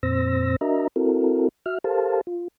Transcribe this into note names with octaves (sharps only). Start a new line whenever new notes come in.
F2 A#2 C4 C5 E6 A#6
D4 F#4 A#4 D#5 E5 A#5
C4 E4 F#4 A4 A#4
F#4 E5 F6
G4 A4 A#4 C5 F5 A5
F4